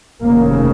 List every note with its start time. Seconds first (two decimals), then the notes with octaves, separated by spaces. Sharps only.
0.22 F1 D#2 C#3 A#3